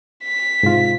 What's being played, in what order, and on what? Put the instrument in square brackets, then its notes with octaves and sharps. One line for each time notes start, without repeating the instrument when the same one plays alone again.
[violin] B6
[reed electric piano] G#2 C3 F4